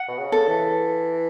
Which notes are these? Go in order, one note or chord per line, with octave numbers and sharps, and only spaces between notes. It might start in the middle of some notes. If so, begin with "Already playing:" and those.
Already playing: F#5
B2
C#3
A4
E3